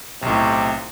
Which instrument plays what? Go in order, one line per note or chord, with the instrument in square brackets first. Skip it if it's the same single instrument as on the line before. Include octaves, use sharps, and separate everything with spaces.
[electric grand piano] B1 A2 [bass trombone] C3